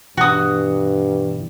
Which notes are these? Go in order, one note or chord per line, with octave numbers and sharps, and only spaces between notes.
G2 B2 E3 F#4 D#6